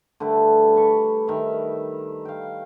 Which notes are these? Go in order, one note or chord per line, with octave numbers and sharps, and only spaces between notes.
D3 G3 A3 B4
A5 B5 C#6
D#3 E5
F5 G5